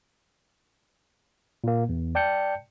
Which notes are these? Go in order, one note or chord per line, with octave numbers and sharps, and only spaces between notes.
A#2 A#3
E2
D5 G5 A5 G6 C#7